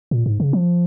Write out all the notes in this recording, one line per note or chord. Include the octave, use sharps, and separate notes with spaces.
A#2
G#2
C#3
F3